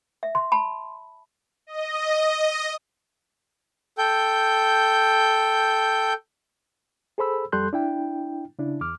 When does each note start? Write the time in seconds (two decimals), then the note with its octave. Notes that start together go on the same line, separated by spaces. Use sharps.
0.23 E5
0.35 C6
0.52 A5 B5
1.67 D#5
3.98 A4 G5 G6
7.18 G#4 A4 C5 B5 E6
7.52 F2 G3 A4 C6 F#6 G6
7.73 D4 E4 G5
8.59 C#3 D4 E4
8.81 E2 D6 F6